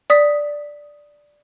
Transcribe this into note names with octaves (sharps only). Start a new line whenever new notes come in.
D5 D#6 B6